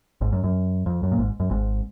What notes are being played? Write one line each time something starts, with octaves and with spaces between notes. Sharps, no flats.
G#1 G#2
F#2
F#2
F2
F#2
A#2
G#1 G#2
F#2
G#1 G#2